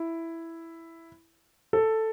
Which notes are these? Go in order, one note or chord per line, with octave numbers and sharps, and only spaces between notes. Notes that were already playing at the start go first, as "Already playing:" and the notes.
Already playing: E4
A4